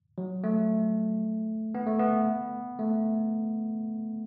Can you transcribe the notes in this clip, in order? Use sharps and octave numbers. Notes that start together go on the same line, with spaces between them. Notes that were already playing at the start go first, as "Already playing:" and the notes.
F#3
A3
B3
A3
B3
A3